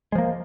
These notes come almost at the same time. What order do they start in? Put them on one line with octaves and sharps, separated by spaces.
G#3 F3 A#3